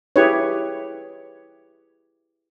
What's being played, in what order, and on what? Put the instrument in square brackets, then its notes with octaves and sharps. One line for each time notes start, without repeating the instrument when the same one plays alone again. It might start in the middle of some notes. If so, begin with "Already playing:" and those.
[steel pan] E4 G4 G#4 B4 C#5